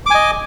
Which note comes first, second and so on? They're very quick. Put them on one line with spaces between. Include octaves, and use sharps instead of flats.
D6 G#5 D#5